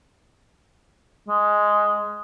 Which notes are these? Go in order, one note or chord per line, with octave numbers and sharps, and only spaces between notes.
G#3